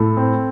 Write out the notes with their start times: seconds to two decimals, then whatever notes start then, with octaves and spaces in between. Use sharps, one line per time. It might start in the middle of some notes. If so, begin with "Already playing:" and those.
Already playing: A2 A4
0.17 C4